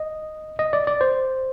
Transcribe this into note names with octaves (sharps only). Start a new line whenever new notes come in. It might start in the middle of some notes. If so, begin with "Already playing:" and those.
Already playing: D#5
D#5
D5
D5
C5